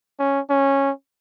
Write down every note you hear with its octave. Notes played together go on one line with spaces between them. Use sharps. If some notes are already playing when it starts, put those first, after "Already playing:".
C#4
C#4